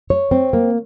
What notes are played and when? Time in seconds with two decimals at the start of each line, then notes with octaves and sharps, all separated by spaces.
0.10 C#5
0.31 C4
0.53 A#3